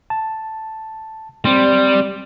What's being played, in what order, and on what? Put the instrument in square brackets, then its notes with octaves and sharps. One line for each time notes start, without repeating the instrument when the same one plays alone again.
[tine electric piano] A5
[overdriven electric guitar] G3 [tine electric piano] C4 C6